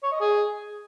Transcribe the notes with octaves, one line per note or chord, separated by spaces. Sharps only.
C#5
D#5
G#4